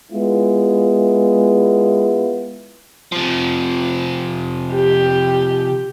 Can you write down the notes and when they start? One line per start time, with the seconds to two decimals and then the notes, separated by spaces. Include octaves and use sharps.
0.11 G#3 B3 E4 F4
3.12 C3 F3
4.74 G4